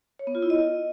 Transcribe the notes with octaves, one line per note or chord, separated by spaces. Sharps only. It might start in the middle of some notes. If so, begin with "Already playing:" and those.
C#5
B3
F4
E4
D#5